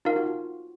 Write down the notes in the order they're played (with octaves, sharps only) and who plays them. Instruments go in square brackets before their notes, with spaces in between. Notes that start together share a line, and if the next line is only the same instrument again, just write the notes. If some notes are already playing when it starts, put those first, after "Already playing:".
[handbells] D#4 A#4 F5 [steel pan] F4
[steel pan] F#4
F4